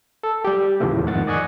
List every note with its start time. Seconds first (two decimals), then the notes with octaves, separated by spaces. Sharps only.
0.23 A4
0.45 G3 G4
0.80 D#2 A2 C#3 E3 F3 A3
1.04 F2 G#2 D#3 F#5 A6
1.27 D5 D#5 G#5 C#6 F#6